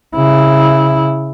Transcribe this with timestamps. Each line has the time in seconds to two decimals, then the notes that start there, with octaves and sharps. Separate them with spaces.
0.15 C#3 E4